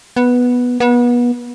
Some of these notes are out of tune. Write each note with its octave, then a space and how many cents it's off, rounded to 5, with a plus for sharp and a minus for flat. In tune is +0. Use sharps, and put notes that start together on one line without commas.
B3 -5
B3 -30